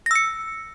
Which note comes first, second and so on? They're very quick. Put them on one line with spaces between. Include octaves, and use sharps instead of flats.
A#6 E6 C#7